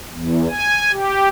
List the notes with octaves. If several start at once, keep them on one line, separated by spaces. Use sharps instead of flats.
E2
G#5
G4